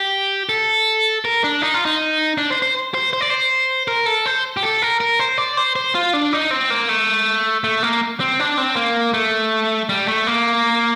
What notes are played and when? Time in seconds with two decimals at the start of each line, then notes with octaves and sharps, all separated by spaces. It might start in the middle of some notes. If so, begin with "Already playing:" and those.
Already playing: G4
0.49 A4
1.25 A#4
1.44 D4
1.62 D#4
1.74 F4
1.85 D#4
2.38 D4
2.50 C5
2.62 C5
2.94 C5
3.13 C5
3.21 D5
3.30 C5
3.88 A#4
4.06 A4
4.26 C5
4.57 G4
4.63 A4
4.82 A#4
5.00 A#4
5.19 C5
5.38 D5
5.57 C5
5.76 C5
5.95 F4
6.13 D4
6.33 D#4
6.51 C4
6.70 A#3
6.89 A3
7.64 A3
7.83 A#3
8.20 C4
8.40 D4
8.58 C4
8.76 A#3
9.14 A3
9.89 G3
10.08 A3
10.27 A#3